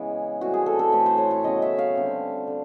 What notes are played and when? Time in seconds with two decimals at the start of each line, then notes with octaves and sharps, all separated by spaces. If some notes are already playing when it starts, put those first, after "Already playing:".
Already playing: C#3 E3 G#3 B3
0.41 A2 E3 G3 C4 F#4
0.54 G#4
0.66 A4
0.79 A4
0.92 A2 E3 A3 B4
1.06 C5
1.18 C#5
1.31 C#5
1.44 C#3 F#3 B3 D#5
1.62 E5
1.79 F5
1.95 D3 G3 C4
2.47 D3